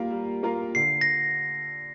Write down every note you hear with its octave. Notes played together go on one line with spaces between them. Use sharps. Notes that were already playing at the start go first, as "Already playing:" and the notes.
Already playing: G3 A#3 F4 A#4 F5
G3
A#3 F4 A#4 F5
D3 C7
A#6